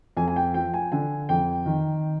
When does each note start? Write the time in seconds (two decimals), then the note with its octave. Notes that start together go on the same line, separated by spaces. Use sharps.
0.17 F2 G#5
0.28 G#5
0.36 G5
0.54 F3 G5
0.74 G#5
0.92 D3 G#5
1.29 F2 G5
1.66 D#3